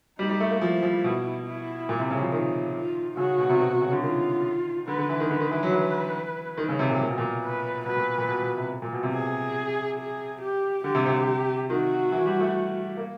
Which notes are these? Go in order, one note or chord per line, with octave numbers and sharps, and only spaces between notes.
G3 D#4
G3
A3
A#3
F3 E4
F3
B2
E4
A#2
C3
C#3
F3
D#3 F4
F4
C#3 F#4
B2
C3
B2
C3
C#3
D3
D#3 F4
D3 B4
D3
E3
D#3
D3 B4
D#3
E3
F#3
E3
D#3
C#3
C3
A#2
A#2 A#4
B2
A#2
B4
B2 B4
A#2
A#2
B2
B2
C3
A#2
B2
C3
G#4
G#4
G4
D3 G4
C3
C3
C3
D#3 F#4
E3
G3
A3
A#3